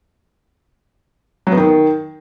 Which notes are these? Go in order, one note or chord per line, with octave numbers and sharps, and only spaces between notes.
F#3
B3
D#3